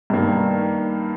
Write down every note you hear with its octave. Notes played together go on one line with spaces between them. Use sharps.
G2 D#3 G3 A#3